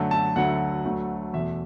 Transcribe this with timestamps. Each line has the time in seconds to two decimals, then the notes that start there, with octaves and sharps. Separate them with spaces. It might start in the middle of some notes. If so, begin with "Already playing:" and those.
Already playing: F#2 D3 F#3 A3
0.11 A5
0.36 D2 D3 F#3 A3 F#5
0.85 D2 D3 F#3 A3
1.33 E2 B2 A3 E5